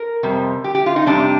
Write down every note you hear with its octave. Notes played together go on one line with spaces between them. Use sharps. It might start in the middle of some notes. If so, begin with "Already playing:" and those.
Already playing: A#4
F2 C3 G3
G4
G4
F4
D#4
F2 C3 G3 D4